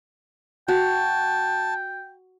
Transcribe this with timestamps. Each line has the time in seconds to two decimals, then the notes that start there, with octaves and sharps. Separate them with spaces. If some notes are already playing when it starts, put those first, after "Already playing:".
0.68 F#4 G5 A5